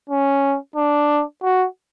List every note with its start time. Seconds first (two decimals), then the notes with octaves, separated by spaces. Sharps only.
0.10 C#4
0.76 D4
1.43 F#4